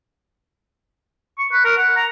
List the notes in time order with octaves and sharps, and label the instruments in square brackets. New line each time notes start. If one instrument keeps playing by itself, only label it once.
[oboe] C#6
B4
A#4
F#5
A#5